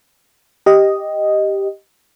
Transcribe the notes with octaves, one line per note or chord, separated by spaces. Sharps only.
G4 D#5